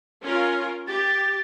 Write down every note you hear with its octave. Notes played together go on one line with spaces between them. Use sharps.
C#4 F4 A#4
G4 A6